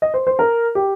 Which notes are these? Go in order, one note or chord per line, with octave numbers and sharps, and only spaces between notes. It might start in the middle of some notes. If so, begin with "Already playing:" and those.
D#5
C5
C5
A#4
G4